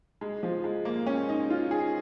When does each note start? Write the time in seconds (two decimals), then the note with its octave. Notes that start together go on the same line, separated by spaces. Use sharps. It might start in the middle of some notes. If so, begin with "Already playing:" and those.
0.21 G#3
0.43 F3
0.64 G#3
0.85 A#3
1.06 C#4
1.29 D#4
1.50 F4
1.71 G#4